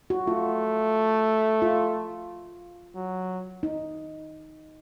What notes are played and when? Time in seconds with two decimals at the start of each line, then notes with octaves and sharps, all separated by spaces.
0.10 F#4
0.27 A3 F4
1.62 F4
2.95 F#3
3.63 D#4